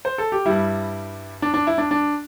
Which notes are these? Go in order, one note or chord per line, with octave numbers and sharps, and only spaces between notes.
C5
A4
G4
G2 G3 E4
D4
D4
E4
D4
D4